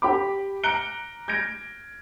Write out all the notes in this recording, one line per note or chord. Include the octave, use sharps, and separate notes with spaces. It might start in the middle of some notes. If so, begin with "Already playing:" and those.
G4 G5 B5 D6
A#5 F#6 C#7 D7 G7
G6 G#6 A#6 D7